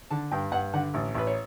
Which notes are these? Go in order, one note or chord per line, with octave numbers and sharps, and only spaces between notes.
D3 A5
G2 G5
G2 F#5
D3 F#5
A1
A1 B4
C#5